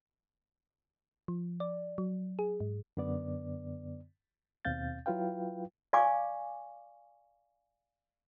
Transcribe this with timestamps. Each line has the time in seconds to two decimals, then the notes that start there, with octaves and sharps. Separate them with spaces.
1.28 F3
1.60 D5
1.98 F#3
2.39 G#4
2.60 G#2
2.97 F#2 D3 B3 D5
4.65 D#2 B2 C4 F5 G6 A6
5.06 F#3 E4 F4 B4 F5 G5
5.93 D5 F5 G#5 C#6 D6